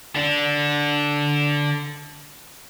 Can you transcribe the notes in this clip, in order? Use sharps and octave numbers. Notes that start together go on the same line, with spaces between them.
D3 D4